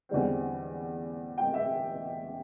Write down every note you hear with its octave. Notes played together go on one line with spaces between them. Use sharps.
E2 D3 G3 C4
G5
E5